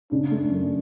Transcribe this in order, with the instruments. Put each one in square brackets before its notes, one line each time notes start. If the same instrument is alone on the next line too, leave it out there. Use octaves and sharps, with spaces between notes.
[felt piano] C#3 [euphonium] D4
[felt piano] A3
F#2